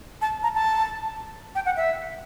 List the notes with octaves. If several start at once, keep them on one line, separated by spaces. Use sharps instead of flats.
A5
A#5
A5
G5
F#5
E5